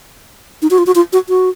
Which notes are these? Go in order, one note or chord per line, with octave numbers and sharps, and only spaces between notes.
D#4
F#4
F4
F#4
F4
F#4
F#4